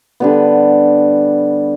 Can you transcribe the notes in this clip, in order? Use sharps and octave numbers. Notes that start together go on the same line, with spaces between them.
D3 G3 B3